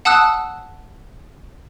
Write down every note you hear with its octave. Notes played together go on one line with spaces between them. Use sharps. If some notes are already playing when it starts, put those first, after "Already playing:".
F#5 A5 D#6 E6 F#6